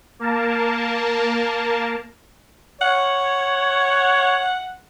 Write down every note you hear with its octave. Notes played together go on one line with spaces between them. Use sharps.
A#3 A#4 A5
C#5 F#5